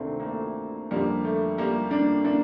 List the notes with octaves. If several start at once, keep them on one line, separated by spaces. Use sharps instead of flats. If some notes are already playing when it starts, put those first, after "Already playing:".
Already playing: D2 C3 D#3 A3 A#3 C4 D4
A#3
A3
F2 D3 F3 G3 A#3
A3
G3 A#3
A#3 D4
D3 A#3 D4